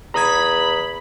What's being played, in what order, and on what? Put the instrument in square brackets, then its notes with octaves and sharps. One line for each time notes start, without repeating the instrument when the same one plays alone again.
[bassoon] E2 [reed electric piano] A#5 D#6 G#6 [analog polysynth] B5